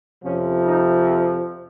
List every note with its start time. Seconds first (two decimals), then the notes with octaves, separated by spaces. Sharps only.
0.24 F2 C3 F3 C#4
0.65 D#4